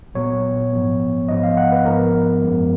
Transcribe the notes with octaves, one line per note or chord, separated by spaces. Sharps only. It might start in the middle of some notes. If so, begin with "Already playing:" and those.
A#2 F#3 B3 C#5
G#2 F3 B3
G#2 F3 B3 D#5
F5
F#5
B4
G#2 F3 B3 A#4
F#2 F3 G#3 B3